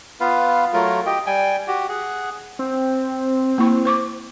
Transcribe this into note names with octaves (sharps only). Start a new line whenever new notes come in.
B3 F4 B4 F5
F#3 A3 F4 A#4
G4 D#5 G5
G3 G5 G#5
F#4 G4
G#4 F#5
C4
A#3 E4 C#6
C5 C#6 D6